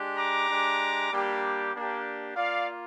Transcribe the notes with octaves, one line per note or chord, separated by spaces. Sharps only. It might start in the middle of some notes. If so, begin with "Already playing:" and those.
Already playing: G#3 D4 G4
A#5 D6
G#3 D4 G4
G3 A#3 D4 G4
A#3 D4 G4
A#3 F4 D5 F5